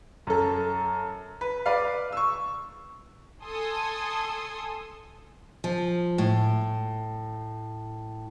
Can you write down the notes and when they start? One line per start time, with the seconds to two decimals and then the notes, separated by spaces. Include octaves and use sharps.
0.27 F#2 A4
1.41 B4
1.66 B4 D5 F5
2.12 C#6 E6
3.43 A4 G#5 C6 D#6
5.64 F3
6.18 A2